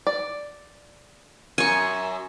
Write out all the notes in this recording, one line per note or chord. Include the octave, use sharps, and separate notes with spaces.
D5
F#2 G#5 C#6